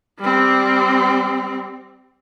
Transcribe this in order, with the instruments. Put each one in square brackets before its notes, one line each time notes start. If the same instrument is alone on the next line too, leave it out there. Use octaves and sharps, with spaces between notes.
[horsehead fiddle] G3 C4